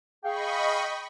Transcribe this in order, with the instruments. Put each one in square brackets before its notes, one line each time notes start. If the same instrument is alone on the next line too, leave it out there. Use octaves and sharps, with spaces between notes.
[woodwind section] G#4 F5 [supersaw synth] D#5 B5 C#6 [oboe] G5